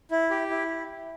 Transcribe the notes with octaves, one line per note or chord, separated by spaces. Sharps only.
E4
G4
E4